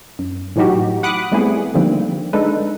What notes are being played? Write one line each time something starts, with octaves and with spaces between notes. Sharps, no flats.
F#2
A2 E3 F#3 D#4 F#4 G4
F#5 B5 D6 D#6 F#6
G3 A3 B3 C4 E4 G#4
D3 D#3 F3 G3 A#3 C4
G#3 D4 D#4 A4 B4